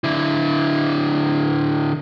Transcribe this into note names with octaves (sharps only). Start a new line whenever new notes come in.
D3 E4